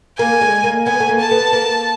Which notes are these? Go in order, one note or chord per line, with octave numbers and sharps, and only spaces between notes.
A#3 G#5
G#3
A#3
B3 G#5
A3
A#3
A5
B3
A#3